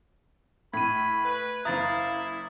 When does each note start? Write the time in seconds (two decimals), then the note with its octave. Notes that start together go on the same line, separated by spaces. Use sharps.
0.74 A2 B5 G#6 D#7
1.25 B4
1.65 F#1 E4 F5 A#5 D#6 A6